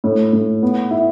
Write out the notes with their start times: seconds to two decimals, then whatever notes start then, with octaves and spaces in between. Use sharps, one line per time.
0.04 A2
0.33 A2
0.63 B3
0.91 E4